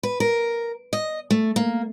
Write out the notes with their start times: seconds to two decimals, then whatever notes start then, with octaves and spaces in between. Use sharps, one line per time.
0.03 B4
0.20 A#4
0.93 D#5
1.31 A3
1.56 A#3